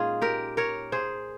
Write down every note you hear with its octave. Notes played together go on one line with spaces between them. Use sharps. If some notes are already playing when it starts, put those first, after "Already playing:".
Already playing: A#2 G#3 C#4 D#4 F4 G#4
G4 A#4
A#4 C#5
G#4 C5